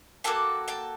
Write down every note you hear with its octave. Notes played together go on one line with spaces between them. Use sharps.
A#3 D4 F#4 A4 G5 A5
G5 A5